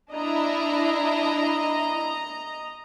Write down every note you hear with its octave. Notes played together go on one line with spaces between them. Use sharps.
D4 E4 D#5 A#5